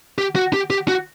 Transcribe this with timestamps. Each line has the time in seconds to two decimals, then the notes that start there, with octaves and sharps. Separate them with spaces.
0.18 G4
0.36 F#4
0.53 G4
0.70 G4
0.88 F#4